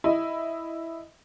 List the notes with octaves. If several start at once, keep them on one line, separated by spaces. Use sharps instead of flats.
E4 D#5